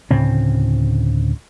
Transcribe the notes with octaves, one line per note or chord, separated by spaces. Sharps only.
D2 A2 C#3 C4